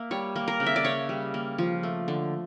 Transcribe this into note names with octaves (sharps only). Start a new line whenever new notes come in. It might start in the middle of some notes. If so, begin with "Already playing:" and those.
Already playing: A#3 E5
G3 C#5
A#3
A#4
C#3
E5
D5
C#3 C#5
G3
A#3
F3
A3
D3